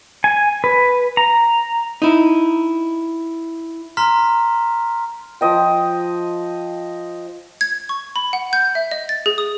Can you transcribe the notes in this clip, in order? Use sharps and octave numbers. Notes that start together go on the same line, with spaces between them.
G#5
B4
A#5
D#4 E4
A#5 C6 F6 B6
F3 C5 D#5 G5
G#6
C#6
B5
F#5
G6
E5
D#5
A6
G#4
D#6